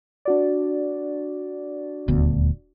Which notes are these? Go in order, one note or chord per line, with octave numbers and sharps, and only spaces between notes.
D4 F#4 D5
D#1 D2 B3